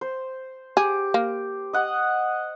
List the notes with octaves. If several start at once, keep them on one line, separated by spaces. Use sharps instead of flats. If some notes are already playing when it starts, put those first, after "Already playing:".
C5
G4 G#4
A#3
D#5 F#5 D#6